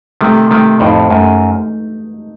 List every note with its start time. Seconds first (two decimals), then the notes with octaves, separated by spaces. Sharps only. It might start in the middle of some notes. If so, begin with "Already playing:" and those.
0.21 C3 D#3 A3
0.51 C3 D#3 A3
0.80 F2 A2 D#4
1.10 F#2 A3